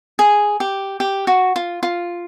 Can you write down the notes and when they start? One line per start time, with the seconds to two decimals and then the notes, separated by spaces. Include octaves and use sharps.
0.19 G#4
0.60 G4
1.00 G4
1.27 F#4
1.56 F4
1.83 F4